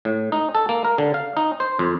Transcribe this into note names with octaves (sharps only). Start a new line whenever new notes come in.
A2
D#4
A4
A#3
A#4
D3
F5
D#4
C5
F2